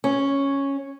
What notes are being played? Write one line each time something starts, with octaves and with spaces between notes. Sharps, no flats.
C#4